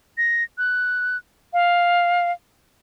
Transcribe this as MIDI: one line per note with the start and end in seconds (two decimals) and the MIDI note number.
0.18 0.44 94
0.58 1.17 90
1.53 2.31 77